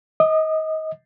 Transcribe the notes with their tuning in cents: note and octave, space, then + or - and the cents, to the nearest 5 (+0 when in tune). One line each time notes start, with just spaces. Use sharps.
D#5 +25 D#6 -40